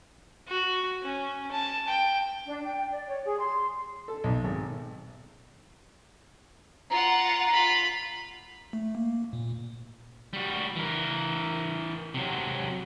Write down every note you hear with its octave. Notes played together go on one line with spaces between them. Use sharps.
F#4
C#4
A5
G5
D4
G5
D5
C#5
G#4
C6
A4
B1
G#1
F4 F#5 A#5
F4 B5
A3
A#3
A#2
G3 F#4
E3 A#4
C3 F#3